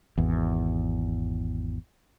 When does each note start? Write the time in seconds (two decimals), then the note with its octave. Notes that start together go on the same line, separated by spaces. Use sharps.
0.18 G#1 E2